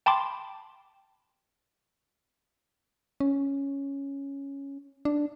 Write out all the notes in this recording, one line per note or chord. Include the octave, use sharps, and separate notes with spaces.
G5 A5 B5 C6 D6
C#4
D4